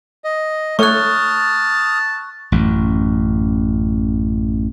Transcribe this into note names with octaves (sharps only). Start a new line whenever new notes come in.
D#5
A3 C#5 A5 C#6 D#6 F6 F#6
A1 F#2